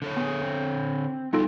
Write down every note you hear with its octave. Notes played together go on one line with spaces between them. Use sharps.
D3 A4 C#5
B3 G#4
C4
G3 B3 D#4 F4 F#4 A4